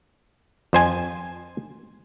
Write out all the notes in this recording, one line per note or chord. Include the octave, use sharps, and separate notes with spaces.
F2 C5 G#5